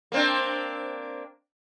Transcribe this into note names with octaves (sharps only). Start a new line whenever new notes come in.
A#3 C4 D4